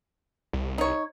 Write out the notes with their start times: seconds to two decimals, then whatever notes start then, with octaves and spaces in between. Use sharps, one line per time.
0.53 C2
0.78 D#4 C#5